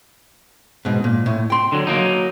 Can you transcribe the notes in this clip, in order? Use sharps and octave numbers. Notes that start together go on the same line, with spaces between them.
G#2 B2
A#2
A2
G5 C6
D3 F#3
F#3 A#3 D#4